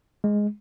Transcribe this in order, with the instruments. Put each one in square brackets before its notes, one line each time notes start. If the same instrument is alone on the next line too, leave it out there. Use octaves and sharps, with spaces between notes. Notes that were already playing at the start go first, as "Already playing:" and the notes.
[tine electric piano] G#3